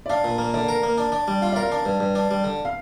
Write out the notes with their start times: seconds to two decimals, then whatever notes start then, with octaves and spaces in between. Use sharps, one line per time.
0.06 D5
0.10 D4 F5
0.24 A#2
0.38 A#3
0.54 D3 D5
0.69 A#4
0.83 A#3
0.98 D4
1.12 D4
1.28 G3
1.42 F4 F5
1.52 A#4 D5
1.62 F5
1.72 D4
1.85 G2
2.00 G2
2.15 D4
2.31 G3
2.44 D3
2.65 F5